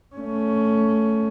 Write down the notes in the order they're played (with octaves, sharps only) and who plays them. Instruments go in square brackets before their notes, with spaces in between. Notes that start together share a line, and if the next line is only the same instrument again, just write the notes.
[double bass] A3 C#4